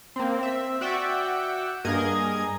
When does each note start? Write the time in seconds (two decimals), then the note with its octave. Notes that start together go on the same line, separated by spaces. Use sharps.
0.16 A#3 C4
0.39 C4 E5
0.81 F#4 D5 E5 F#5 G5
1.85 G2 A#3 G#4 A#4 D#5 G#6